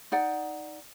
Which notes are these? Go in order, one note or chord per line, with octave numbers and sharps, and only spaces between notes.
D#4 D5 F#5